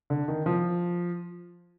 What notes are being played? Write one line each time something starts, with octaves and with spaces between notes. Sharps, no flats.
D3
D#3
F3